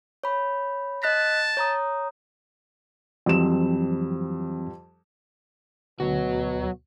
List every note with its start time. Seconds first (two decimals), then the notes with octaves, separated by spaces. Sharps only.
0.24 C#5 B5
1.03 D#5 A5 F#6 B6
1.57 C#5 A#5 D#6
3.26 F2 E3 F#3 G3 C4 E7
6.00 D2 B2 F#3 F#4